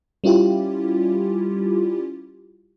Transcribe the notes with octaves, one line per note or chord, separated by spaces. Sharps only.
G3 C#4 E4 F4 G4